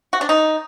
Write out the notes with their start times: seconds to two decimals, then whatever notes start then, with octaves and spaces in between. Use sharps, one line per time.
0.13 F#4
0.21 D4
0.29 D#4